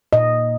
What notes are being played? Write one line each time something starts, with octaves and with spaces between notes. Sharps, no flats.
A#2 D#5